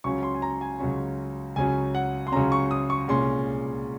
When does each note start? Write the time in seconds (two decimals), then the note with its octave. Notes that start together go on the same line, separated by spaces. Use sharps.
0.04 C#2 C#3 F#3 C#4 C#6
0.23 C6
0.34 G#5
0.42 A#5
0.61 G#5
0.79 C#2 C#3 F#3 C#4
1.56 C#2 C#3 F#3 C#4 G#5
1.95 F#5
2.27 C6
2.32 C#2 C#3 F#3 C#4 A#5
2.52 C#6
2.71 D#6
2.90 C#6
3.08 C2 A#2 G#3 C#4 C6